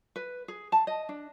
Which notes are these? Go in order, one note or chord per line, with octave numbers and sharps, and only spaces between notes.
B4
G#4
A5
D#5
D4